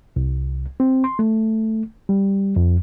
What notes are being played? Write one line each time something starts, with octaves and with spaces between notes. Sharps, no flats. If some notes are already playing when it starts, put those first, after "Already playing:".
C2
C4
C6
A3
G3
F2